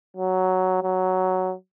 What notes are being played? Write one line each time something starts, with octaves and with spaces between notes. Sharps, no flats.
F#3
F#3